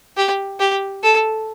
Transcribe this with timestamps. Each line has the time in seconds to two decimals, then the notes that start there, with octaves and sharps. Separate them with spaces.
0.17 G4
0.60 G4
1.03 A4